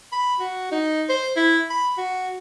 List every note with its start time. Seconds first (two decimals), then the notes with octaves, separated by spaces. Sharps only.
0.12 B5
0.40 F#4
0.72 D#4
1.09 C5
1.36 E4
1.70 B5
1.98 F#4